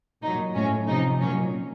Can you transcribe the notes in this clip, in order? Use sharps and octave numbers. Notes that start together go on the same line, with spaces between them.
A#2 F#3 D#4
A2 F#3 C#4
C3 F3 D#4
A#2 F#3 C#4